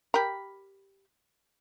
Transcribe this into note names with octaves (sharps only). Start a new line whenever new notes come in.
G4 A#4 B5